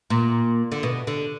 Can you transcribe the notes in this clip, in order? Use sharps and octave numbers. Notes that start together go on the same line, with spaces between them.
A#2
D3
B2
D3